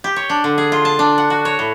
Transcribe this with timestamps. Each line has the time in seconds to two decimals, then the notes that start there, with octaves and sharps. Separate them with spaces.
0.04 G4
0.16 C#5
0.30 D4
0.44 D3
0.58 G#4
0.72 F4
0.85 A5
0.99 D4
1.18 F#5
1.30 F#4
1.45 C#5
1.59 A2